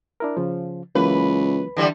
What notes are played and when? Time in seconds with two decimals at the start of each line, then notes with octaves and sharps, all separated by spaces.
0.20 D4 E4 A#4
0.37 C#3 F3
0.95 C#2 E3 F#3 A#3 B4
1.77 D3 E3 G3